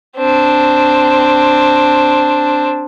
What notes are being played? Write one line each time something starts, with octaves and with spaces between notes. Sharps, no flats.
C4 D4